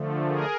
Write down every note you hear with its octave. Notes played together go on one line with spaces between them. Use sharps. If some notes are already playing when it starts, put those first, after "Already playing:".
Already playing: D3 F3 A3
G#4 A#4